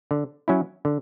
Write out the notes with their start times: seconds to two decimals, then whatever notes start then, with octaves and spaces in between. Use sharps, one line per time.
0.11 D3
0.48 F#3 C#4 E4
0.85 D3